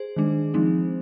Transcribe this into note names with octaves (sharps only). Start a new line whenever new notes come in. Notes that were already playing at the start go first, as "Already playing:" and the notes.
Already playing: G#4 C5
D#3 G#3 D4
F3 G#3 C4 D#4